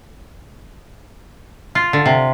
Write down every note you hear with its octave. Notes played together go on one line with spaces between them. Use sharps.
F4
D3
C3